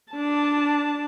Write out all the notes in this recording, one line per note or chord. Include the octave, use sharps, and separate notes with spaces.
D4 A5